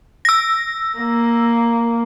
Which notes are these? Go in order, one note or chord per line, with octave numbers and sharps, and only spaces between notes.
E6 A#6
A#3